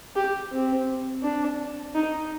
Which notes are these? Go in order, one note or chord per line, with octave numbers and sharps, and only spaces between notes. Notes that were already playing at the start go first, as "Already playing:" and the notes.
G4
C4
D4
D#4